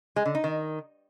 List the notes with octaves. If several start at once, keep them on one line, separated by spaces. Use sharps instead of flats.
G#3
D3
D#4
D#3